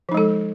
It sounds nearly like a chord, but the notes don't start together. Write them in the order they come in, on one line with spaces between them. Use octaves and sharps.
F3 D#4 G#3 A4